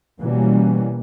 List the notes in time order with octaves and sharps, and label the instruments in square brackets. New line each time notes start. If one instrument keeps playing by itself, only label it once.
[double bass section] B2 E3 G3 A#3 C#4